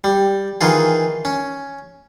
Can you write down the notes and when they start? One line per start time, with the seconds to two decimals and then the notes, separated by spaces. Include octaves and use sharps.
0.04 G3
0.61 D#3 E3 F4 G#4
1.25 C#4